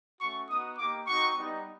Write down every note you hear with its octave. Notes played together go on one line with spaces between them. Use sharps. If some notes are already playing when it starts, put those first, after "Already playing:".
A3 C#4 F#4 C#6
B3 D#4 F#4 D#6
A#3 D#4 G4 D6
C4 D#4 F#4 C#6
G3 B3 D#4